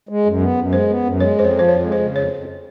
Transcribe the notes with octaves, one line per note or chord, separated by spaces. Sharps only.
G#3
F#2
B3
F#2
G#3 C5
B3
F#2
G#3 C#5
F2 C5
C#5
F3
C5
F2 C#5
G#3
C5
C#3
F2 C#5
F2